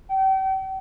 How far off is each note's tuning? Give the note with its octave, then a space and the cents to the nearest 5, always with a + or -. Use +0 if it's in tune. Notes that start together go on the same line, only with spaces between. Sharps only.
G5 -40